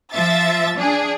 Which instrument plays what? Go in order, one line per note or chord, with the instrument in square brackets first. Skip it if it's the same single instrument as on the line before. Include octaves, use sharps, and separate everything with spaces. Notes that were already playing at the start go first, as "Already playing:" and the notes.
[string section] F3 E5 A6
D4 G#4